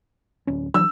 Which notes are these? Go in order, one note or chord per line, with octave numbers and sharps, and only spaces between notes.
D1 C#4
E3 F#3 E6